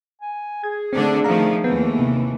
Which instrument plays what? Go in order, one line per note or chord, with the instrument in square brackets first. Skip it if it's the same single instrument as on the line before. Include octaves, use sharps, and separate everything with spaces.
[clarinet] G#5
[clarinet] G#4 [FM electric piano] G#6
[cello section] D3 A3 D4 [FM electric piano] C4
[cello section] D#3 F3 A3 [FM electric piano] F5 A#5
[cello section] D#2 E3 A3 [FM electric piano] B3
[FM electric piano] C3